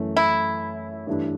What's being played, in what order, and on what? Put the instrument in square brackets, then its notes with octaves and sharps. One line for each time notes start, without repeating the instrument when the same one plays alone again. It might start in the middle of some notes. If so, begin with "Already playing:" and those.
Already playing: [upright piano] F#2 E3 A3
[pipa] E4
[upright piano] G2 E3 A3 D4